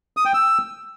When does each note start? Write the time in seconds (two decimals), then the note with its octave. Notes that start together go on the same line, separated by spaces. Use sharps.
0.17 D#6
0.25 G5
0.34 E6